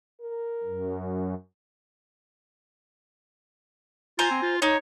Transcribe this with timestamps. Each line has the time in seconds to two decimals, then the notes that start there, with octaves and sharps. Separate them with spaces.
0.21 A#4
0.63 F#2
4.19 F4 C5 G#5 A#5
4.31 C4
4.42 F4
4.62 D#4 C#5